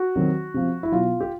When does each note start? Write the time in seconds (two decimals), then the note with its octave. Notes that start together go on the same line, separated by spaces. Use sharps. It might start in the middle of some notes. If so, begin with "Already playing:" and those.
Already playing: F#4
0.16 C3 D#3 F#3
0.54 C3 F3
0.83 E4
0.92 B2 F#3 F4
1.20 G4